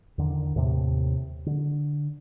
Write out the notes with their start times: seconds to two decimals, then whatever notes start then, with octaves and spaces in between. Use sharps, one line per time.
0.18 E2 D3 D#3
0.56 D#2 A2 C3
1.46 D3